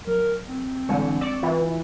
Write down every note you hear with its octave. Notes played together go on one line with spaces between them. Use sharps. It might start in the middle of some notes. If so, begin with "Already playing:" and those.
F#3 A#4
C4
G#2 D3 E3 G3 G#3 G#5 C#6
D5 C#6 E6
E3 F4